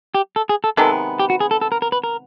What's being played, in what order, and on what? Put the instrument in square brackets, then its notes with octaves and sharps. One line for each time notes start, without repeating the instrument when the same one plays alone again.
[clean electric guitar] G4
A4
G#4
A4
[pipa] C3 D#3 G#3 B3 [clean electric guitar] A4
[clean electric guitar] G4
F#4
G#4
A4
A4
A#4
A#4
B4
A#4